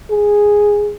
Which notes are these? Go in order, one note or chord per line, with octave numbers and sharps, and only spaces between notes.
G#4